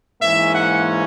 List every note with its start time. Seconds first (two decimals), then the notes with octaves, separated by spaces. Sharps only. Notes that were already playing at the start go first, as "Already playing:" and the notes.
0.21 G#2 E3 A#3 C#4 E5
0.54 F#5